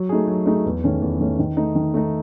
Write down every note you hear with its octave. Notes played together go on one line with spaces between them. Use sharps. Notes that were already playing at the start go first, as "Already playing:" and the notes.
Already playing: F#3
A3 D#4 G#4
F#3
A3 D#4 G#4
E2
D#3 A3 C#4
E2
D#3 A3 C#4
D#3
A3 D#4
D#3
A3 D#4